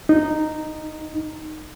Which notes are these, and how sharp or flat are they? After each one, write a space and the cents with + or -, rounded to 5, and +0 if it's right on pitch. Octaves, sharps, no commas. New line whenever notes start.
D#4 -10